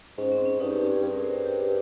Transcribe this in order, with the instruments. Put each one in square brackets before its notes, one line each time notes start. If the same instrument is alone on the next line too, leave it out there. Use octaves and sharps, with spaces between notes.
[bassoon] G#2 [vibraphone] C#4
[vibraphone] C4
C#4
[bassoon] G2 [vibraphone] D#4
[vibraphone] G4
G4
G#4
[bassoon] G2 [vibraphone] G#4
[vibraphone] A#4
C5
A#4
G4